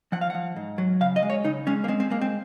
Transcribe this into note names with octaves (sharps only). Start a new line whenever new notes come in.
F3 F#5
F5
F3 F#5
G#2
F#3
C#3 F5
D#5
G#3
C#5
C#3 D#4
G#3 C#4
A#3
G#3 C4
C4
G#3 A#3
C4